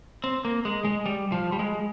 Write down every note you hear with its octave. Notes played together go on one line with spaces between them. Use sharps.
C4
A#3
G#3
G#3
G3
F3
G3
G#3